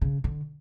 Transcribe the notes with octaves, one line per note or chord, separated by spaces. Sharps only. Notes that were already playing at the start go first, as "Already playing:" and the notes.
C#3
D3